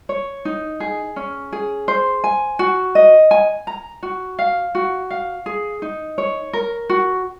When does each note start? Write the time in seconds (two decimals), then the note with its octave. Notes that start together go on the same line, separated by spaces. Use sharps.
0.09 C#5
0.45 D#4
0.80 G#4
1.16 C#4
1.52 G#4
1.88 C5
2.24 G#5
2.59 F#4
2.95 D#5
3.31 G#5
3.67 A#5
4.03 F#4
4.39 F5
4.75 F#4
5.10 F5
5.46 G#4
5.82 D#4
6.18 C#5
6.53 A#4
6.89 F#4